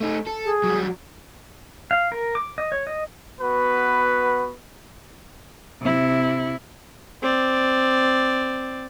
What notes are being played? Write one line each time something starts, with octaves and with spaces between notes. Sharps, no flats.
A3 D#4
A4
G#4
F#3 G3
F5
A#4
D6
D#5
C#5
D#5
B3 F#4 B4
C3 E4
C4 D5